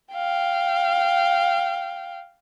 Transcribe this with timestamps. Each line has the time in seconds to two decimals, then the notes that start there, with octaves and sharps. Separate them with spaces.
0.14 F5 G5